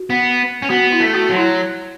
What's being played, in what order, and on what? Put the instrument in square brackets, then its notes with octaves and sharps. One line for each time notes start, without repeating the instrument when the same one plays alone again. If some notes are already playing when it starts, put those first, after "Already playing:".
Already playing: [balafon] F#4
[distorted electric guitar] B3
C#4
[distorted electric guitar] B3 [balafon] F#4
[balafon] E4
[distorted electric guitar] A3
[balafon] F#4
[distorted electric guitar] F#3
[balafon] E4